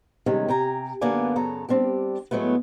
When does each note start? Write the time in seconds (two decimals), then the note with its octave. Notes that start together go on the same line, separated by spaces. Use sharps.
0.26 C3 D#3 G3 G#3 C#4
0.48 C3 G5 G#5 A#5
1.01 F#2 D3 A#3 B3 D5 G#5
1.36 F#2 C#3 A4 A#5
1.69 G3 C4 D4 G4
2.31 A2 F#3 G#3 A3 B3